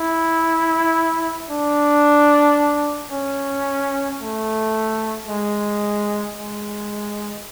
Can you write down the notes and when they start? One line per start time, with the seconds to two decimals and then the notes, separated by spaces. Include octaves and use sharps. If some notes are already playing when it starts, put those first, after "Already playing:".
Already playing: E4
1.50 D4
3.12 C#4
4.20 A3
5.28 G#3
6.36 G#3